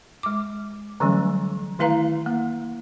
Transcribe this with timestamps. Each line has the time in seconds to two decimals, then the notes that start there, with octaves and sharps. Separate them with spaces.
0.23 G#3 D6
1.00 D3 E3 F#3 G3 A3 C#4
1.79 D#3 A3 E4 B4 F5 A#5
2.26 A#3